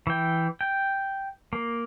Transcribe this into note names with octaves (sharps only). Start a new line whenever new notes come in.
E3 G5
G5
A#3